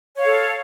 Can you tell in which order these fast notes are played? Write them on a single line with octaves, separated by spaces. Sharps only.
C#5 F5 A4